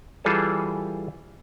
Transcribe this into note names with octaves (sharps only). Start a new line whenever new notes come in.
E3 G3 F4 G#4 A4 A5